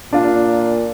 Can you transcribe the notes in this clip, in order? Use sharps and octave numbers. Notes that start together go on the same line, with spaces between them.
A#2 D4 F4